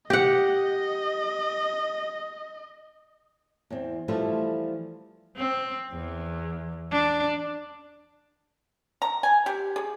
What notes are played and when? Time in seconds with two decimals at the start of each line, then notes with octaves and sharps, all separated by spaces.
0.10 G4 D#5 F#5
3.70 E2 C4
4.08 E3 F3 G3 A3 E4 F4
5.37 C4
5.93 E2
6.91 D4
9.02 A#5
9.23 G#5
9.46 G4
9.76 G#4